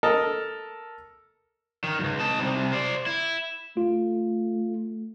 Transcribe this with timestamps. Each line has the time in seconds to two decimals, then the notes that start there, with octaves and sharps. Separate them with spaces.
0.03 A4 A#4 D#5
1.84 D#3
1.99 C#2 F#2
2.20 D#4 A5
2.39 C3 G3
2.73 C5 D5
3.06 E4
3.77 A3 F4